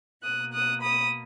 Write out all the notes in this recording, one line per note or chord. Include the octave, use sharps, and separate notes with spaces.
B2 A#3 D#6 F#6
D#6 F#6
B5 D#6